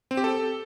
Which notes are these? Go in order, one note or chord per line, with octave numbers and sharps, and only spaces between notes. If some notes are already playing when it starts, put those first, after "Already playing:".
C4
G4
A4